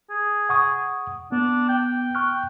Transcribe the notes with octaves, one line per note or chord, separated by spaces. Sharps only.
G#4
F#5 C#6 D#6
B3 D4
G5
C#6 F6 F#6